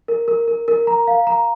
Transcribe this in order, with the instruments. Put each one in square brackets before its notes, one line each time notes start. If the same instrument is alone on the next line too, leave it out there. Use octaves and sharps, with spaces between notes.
[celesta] A#4
A#4
A#4
A#4
A#5
F5
A#5